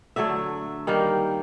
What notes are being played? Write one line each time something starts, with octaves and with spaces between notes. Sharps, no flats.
D3 F#3 A3 E5
D#3 G3 A#3